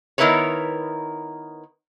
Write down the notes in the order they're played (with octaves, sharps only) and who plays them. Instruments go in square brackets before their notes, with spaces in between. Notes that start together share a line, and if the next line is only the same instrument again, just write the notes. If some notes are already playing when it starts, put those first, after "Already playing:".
[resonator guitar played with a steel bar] D#3 B3 E4 A#4 B4 C#5